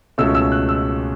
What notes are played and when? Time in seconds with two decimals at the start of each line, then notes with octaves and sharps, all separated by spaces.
0.18 C#2 B2 A3 C#4 E6
0.35 E6
0.52 F#6
0.69 E6